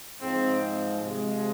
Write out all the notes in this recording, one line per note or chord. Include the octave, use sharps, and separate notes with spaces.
G#2 F3 G#3 C4
C3 F3 G#3